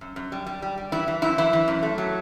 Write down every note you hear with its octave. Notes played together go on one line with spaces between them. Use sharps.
F#2
F#2
G3
G3
G3
G3
E3 E4
E3
F#2 E4
E3 E4
E3
F#2
A3
F#3